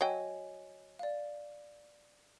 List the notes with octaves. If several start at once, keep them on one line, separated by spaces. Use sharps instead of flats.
F#3 C#5 D#5 G5 G#5
D5 F5